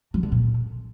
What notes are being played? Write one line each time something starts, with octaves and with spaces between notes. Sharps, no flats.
F#3
D3
A#2